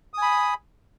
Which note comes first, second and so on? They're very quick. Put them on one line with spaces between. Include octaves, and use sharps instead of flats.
D#6 G#5 B5